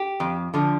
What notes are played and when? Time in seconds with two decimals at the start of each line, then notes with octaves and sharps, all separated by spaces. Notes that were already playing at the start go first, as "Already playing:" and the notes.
Already playing: G4
0.20 F2
0.54 D3 F3